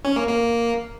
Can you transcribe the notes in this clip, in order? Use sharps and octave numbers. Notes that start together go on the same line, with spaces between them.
C#4
A#3
A#3